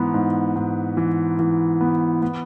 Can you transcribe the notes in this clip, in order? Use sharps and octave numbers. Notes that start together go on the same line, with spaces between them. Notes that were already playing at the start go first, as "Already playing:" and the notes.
Already playing: G#2 E3 B3
G#2
G#2
E3
E3
B3
B3